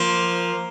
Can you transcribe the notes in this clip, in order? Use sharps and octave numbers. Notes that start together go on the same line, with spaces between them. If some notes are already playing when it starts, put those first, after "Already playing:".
Already playing: F3 A#3